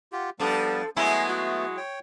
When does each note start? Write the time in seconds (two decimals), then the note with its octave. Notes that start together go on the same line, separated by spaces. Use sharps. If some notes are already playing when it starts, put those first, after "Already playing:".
0.12 F4 G4 F#5
0.39 F3 G3 B3 D4 A4
0.96 F#3 G#3 A3 B3 E4 G#5
1.28 F#4
1.77 C#5 G5